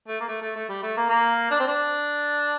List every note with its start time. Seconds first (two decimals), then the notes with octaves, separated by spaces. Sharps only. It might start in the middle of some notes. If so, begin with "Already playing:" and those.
0.08 A3
0.20 A#3
0.29 A3
0.42 A3
0.56 A3
0.69 G3
0.83 A3
0.97 A#3
1.09 A#3
1.51 D4
1.60 C4
1.68 D4